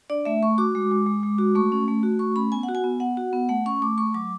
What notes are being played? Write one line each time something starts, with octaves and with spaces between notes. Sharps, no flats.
D4 D5
A3 E5
A3 C#6
F#4 D6
G#3
G#3
G#3
G#3
F#4
A3 C#6
C#4
A3
F#4
A3 C#6
C#4 B5
B3 G#5
F#5
F#4
G#5
B3
B3 F#5
F#4
B3
A3 F#5
C#4 C#6
A3 D6
A3 C#6
F#3 D6